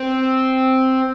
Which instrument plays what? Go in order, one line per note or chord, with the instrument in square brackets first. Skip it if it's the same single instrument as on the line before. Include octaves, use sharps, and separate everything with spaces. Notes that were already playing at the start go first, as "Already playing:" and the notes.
Already playing: [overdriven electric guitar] C4